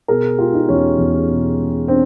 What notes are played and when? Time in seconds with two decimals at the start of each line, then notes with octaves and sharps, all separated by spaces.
0.08 B2 G#4 A#4
0.38 G#3 F4 G4
0.54 D#4 F4
0.69 E2 C#4
0.98 E2
1.28 B2
1.58 G#3
1.88 C4 D4